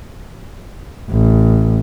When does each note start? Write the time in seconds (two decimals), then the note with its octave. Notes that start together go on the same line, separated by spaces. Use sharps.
1.10 A1